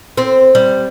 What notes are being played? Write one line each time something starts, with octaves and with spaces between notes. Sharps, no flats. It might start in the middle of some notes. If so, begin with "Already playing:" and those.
C4
G3